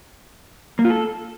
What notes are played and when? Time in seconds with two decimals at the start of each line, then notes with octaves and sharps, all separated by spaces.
0.79 A#3
0.85 F4
0.90 A4